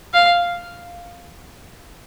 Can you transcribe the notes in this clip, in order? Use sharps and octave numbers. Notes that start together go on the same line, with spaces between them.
F5